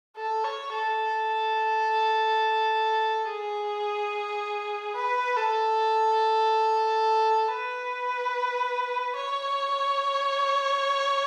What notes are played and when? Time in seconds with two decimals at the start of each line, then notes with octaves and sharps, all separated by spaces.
0.17 A4
0.44 C#5
0.73 A4
3.26 G#4
4.95 B4
5.37 A4
7.48 B4
9.16 C#5